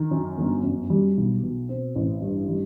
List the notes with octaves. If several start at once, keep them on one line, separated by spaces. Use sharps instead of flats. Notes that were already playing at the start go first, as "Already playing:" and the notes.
Already playing: D#3
F#2
G1
F#2
G3
B1
B2
C4
A1
G2
G3